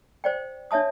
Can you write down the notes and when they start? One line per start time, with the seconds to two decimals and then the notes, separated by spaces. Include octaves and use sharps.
0.24 C5 D5 G5
0.71 D4 C#5 E5 A5 D#6